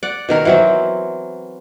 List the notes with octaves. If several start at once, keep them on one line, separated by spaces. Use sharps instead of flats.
D5 F#5
B2 D#3 A#4
E3 F#3 C4